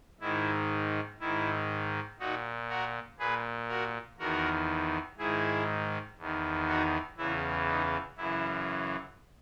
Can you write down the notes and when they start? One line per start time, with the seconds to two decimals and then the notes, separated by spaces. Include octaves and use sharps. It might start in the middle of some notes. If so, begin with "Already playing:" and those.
0.20 G#2 D#3 E4
1.20 G#2 D#3 E4
2.19 A#2 D#4 F#4
2.69 F#4 A#4
3.19 A#2 G#4 B4
3.69 F#4 A#4
4.19 E2 D#3 F#4 A#4
5.18 G#2 D#3 E4 G#4
6.18 E2 D#3
6.67 D#4 F#4
7.17 E2 C#3 E3 E4
7.67 D#4
8.16 F#2 C#3 E3 E4